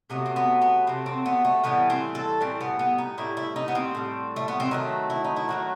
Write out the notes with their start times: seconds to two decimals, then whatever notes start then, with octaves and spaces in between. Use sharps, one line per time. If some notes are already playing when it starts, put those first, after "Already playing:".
0.10 C3 F#3 A3 B3
0.26 C4
0.36 B3
0.62 B3
0.87 C3 F#3 A3 C4
1.06 C4
1.26 B3
1.45 A3
1.64 A2 E3 G3 B3
1.90 C4
2.15 A4
2.40 A2 E3 G3 C4
2.61 B3
2.79 B3
2.98 D#4
3.18 A2 G3 E4
3.37 E4
3.56 D#4
3.68 B3
3.75 C4
3.95 A2 G3
4.36 A3
4.48 B3
4.60 C4
4.71 D#3 F#3 A3 D#4
5.10 E4
5.24 D#4
5.36 E4
5.48 D#3 F#3 A3 F#4